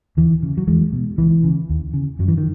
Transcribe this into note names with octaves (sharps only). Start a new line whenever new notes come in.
D#2 E3
C#3
F#3
E2 E3 G#3
B2
C#2 E3
C#3
D#2
C#3
F#2 F#3
E3
D#3